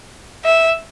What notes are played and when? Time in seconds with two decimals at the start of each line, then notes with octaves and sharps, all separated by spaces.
0.45 E5